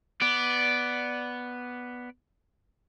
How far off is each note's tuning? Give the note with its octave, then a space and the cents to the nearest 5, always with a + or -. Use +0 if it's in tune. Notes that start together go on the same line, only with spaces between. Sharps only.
B3 +0 D5 +0